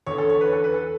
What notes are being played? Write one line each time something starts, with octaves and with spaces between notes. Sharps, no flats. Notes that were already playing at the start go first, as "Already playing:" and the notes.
E2 D3 C#5
A4
C#5
B4
A4
B4
A4